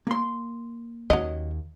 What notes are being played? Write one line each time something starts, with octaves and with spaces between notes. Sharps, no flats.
A#3 C6
D#2 F#3 C#4 D#5